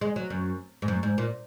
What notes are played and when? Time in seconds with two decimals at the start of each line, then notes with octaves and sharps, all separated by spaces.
0.01 G#3
0.16 F#3
0.30 F#2
0.82 G#2
0.88 F#2
1.03 G#2
1.18 A#2